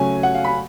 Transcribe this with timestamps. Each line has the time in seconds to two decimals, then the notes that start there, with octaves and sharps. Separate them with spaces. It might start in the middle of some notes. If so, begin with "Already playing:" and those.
Already playing: C#3 F#3 A3 C#4 G#5
0.23 F#5
0.35 F5
0.44 B5